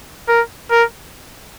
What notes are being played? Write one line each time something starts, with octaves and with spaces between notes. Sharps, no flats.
A#4
A#4